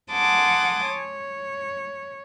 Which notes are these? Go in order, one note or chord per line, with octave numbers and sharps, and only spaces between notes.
F#5 G#5 A5 C6 D6 D#6
C#5